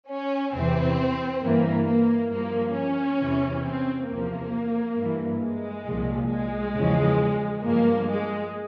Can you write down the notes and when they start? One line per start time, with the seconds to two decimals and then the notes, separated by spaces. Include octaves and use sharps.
0.10 C#4
0.54 E2 C3 E3 C4
1.43 G2 E3 A#3
1.87 A#3
2.31 G2 F3 A#3
2.77 C#4
3.21 E2 C3 E3
3.65 C4
4.09 E2 C3 F3 A#3
4.97 G2 E3
5.42 G#3
5.87 C2 A#2 F3
6.31 G#3
6.75 E2 C#3 F3
7.63 G2 F3 A#3
8.09 G#3